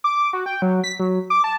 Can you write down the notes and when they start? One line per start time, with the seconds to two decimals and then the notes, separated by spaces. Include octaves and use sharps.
0.04 D6
0.33 F#4
0.46 G5
0.62 F#3
0.84 B6
1.00 F#3
1.30 D6
1.44 A5